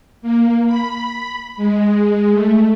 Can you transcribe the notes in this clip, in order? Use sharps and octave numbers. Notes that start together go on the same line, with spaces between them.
A#3
B5
G#3
A3